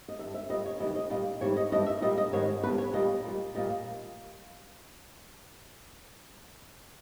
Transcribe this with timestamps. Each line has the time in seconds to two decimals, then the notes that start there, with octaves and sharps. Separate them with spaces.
0.08 D#5
0.19 D#3 G3 E5
0.23 G2
0.34 E5
0.49 A#2 G3 D#5
0.65 C#5
0.80 D#2 C#3 E3 G3 D#5
0.95 D#5
1.10 A#2 G3 D#5
1.41 G#2 E3 G3 C#5
1.56 D#5
1.72 G2 E3 G3 D#5
1.86 E5
2.01 A#2 G3 D#5
2.18 D#5
2.32 G#2 D#3 G3 C#5
2.63 E2 B2 G3 B4
2.78 C#5
2.93 A#2 G3 D#5
3.24 A#2 G3
3.55 A#2 G3 D#5